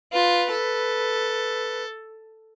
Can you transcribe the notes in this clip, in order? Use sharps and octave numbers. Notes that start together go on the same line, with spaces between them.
F4 B4
A4